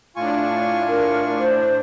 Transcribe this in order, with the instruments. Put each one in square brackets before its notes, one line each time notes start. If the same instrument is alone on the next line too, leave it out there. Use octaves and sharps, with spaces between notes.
[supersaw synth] A2 D4 [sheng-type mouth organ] F4 G#5 C#6
[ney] A#4
C5